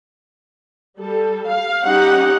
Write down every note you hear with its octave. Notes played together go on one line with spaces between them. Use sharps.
G3 A4
F5
G3 C#4 D#4 G4 F#5